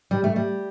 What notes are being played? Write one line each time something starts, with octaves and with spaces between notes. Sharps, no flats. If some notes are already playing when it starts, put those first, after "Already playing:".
G3
A3
G3